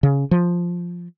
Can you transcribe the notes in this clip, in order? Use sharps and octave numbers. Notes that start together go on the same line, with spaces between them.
C#3
F3